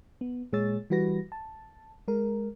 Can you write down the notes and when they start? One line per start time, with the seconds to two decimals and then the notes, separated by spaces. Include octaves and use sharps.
0.21 B3
0.53 A#2 G#3 G#4 C#5 E6 A6
0.90 E3 G3 F#4 B4 A#6
1.32 A5
2.08 G#3 A#4